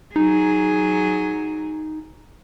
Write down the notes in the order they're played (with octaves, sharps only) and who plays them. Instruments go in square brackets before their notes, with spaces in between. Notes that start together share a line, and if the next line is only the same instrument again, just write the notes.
[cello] F#3 G#4 [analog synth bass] D#4